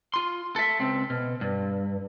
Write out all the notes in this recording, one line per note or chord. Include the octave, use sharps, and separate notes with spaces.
F4 C6
A4 E5
C#2 C4
B2
G2